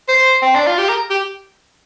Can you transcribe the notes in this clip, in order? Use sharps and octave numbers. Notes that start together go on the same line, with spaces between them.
C5
C4
D4
F4
G4
A#4
G4